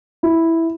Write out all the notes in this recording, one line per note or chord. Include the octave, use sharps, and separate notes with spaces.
E4